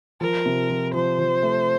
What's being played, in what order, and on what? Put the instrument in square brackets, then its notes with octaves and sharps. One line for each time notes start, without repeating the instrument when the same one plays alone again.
[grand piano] F3 [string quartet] A#4
[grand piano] C3
F3
[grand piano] F3 [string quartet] C5
[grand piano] F3
A3